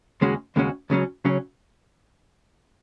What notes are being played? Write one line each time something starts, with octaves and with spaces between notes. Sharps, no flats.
D#2 C#3 G#3 C#4 F#4
D#2 C#3 G#3 C#4 F#4
C#2 C#3 F#3 C#4
C#3 F#3 C#4